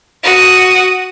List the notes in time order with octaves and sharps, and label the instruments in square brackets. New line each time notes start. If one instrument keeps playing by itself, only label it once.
[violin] F#4 D#6